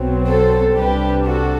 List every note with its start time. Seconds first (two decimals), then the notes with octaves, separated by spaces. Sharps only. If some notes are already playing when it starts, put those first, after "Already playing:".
Already playing: B1 B2 F#3 C4
0.28 A4 C5
0.77 C2 C3 G3 D4 G4 B4
1.26 F#4 A4